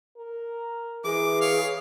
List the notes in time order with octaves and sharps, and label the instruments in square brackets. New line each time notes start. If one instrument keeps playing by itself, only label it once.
[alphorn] A#4
[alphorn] E3 [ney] G#4 [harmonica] D6
[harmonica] C#5 F5